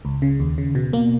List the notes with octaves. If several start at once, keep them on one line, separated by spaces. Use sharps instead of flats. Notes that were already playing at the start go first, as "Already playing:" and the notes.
C#2
C#3
D#2
C#3
B2
A#3